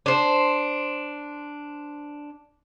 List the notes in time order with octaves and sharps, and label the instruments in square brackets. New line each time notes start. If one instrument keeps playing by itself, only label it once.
[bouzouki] D4 C5